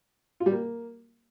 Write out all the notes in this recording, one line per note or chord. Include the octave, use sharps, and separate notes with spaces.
F4
G3
A#3